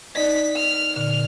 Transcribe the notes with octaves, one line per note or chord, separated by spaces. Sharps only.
D#4 D5 D#5 B6
F6
A#2 D3 F6